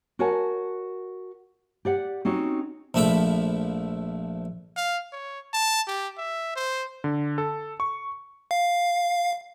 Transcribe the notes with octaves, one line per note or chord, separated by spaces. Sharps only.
F#4 A#4 C#5 F#5 G#5 A5
G4 D5 F#5
C4 C#4 D#4 F#4
A#1 F3 A3 E5 B5 D6
F5
C#5
A5
G4
E5
C5
D3
A4
C#6
F5